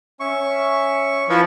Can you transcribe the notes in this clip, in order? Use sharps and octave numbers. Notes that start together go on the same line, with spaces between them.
C#4 E5 C#6
F3 E4 B4 E5